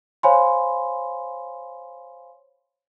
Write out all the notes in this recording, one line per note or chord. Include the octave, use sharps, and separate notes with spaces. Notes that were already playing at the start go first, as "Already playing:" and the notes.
C5 C#5 F5 G#5 B5 C6